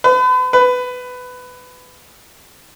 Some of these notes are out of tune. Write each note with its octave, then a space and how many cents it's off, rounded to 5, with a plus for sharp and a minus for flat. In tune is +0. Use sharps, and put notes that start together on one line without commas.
B4 +40
B4 +15